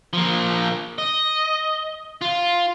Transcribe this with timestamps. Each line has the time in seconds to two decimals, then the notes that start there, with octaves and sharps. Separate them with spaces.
0.13 F3 A#3
0.98 D#5
2.21 F4